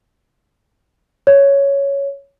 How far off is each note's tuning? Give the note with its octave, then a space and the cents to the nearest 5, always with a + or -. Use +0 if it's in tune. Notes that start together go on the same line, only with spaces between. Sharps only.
C#5 +5